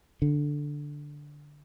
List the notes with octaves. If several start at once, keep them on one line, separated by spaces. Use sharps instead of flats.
D3